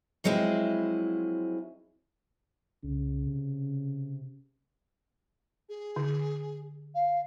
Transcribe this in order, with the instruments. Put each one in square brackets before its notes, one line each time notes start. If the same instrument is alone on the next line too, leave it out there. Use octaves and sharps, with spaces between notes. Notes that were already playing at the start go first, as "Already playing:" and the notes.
[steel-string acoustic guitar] F3 F#3 G#3 C4 E4 G#4
[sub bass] C2 [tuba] C#3
[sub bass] C3
[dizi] G#4
[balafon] D3
[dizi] F5